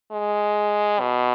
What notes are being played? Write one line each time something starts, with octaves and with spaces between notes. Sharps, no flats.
G#3
B2